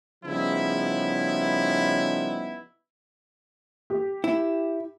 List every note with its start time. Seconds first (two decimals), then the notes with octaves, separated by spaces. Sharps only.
0.24 C#3 F3 G3 B3 D#4 E4
3.90 G4
4.24 E4